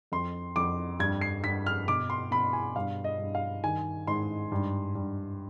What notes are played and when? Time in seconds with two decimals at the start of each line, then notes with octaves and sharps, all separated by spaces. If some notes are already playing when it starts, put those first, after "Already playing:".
0.12 F2 C6
0.56 F2 D6
0.99 G2 G#6
1.21 C7
1.44 G2 B6
1.66 F6
1.88 B2 D6
2.10 C6
2.31 B2 B5
2.53 G#5
2.76 G2 F5
3.04 D#5
3.19 G2
3.35 F5
3.64 D#3 G#5
4.07 G#2 C6
4.52 G2
4.95 G2